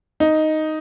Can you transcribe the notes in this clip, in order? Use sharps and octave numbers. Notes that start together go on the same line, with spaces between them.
D#4